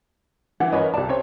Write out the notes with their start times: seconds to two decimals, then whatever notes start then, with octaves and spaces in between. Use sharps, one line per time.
0.60 E3 F#5
0.72 F#2 A#4 B4 C#5 D#5
0.94 C2 D5 A5
1.09 C4 C#5